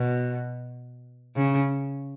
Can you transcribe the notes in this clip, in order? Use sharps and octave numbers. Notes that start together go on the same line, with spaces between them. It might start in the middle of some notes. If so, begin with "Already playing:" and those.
Already playing: B2
C#3